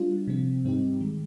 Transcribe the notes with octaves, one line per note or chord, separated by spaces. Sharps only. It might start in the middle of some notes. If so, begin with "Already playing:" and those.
Already playing: G3 D4 F4
C3 F3 C4
G#2 G3 C4 D#4 G4
D#3 G#3